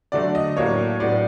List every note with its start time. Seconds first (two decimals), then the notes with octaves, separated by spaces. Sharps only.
0.12 D3 F#3 A3 D4 D5
0.35 D#5
0.56 A2 F#3 A#3 D4 C#5
1.00 A2 F#3 B3 D4 D5